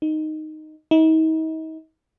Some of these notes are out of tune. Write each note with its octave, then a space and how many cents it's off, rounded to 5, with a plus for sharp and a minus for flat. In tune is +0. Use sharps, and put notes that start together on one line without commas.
D#4 -5
D#4 +40